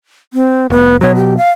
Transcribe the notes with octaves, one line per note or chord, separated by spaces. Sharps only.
C4
F1 B3
B2 F#3 C#5
G4
F5